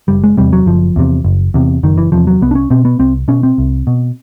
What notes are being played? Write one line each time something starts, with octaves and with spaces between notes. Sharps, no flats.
F#1 G3
G#3
E2 C3 G3
F#3
F#1 F3
E2 C3
F#1
E2 C3
F#1 D#3
E3
E2 C3 F3
F#3
C2 B3
D4
C#4
B2 C4
B3
C2 C4
B2 C#4
C4
C2
B2